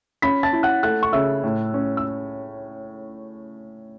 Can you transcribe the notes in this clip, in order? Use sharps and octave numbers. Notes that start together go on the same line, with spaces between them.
C#4 B5 B6
A5 A6
E4
F#5 F#6
A3 F#5 F#6
C#6
C#3 E5 E6
A2
C#4
E6